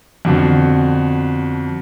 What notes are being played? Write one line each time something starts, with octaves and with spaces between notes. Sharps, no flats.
F2 B2 D3